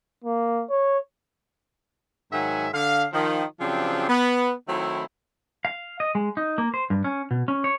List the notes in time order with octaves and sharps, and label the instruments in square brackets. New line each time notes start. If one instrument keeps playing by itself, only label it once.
[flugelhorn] A#3
C#5
[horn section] G#2 D#3 F#3 E5 F#5 G#5
D3 F5
D#3 F3
C#3 F3 F#3 C4 D4 G4
B3
D#3 F#3 A3 C4 E4
[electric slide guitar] F5
D#5
G#3
D#4
A#3
C5
G2
C#4
B2
C#4
C#5